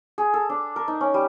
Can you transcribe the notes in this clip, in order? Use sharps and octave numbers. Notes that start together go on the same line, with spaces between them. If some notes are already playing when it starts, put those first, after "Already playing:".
G#4
A4
D4
A#4
D#4
C#4
G3